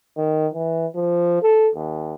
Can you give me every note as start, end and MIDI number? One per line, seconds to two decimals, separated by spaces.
0.17 0.47 51
0.54 0.86 52
0.95 1.41 53
1.42 1.70 69
1.75 2.15 39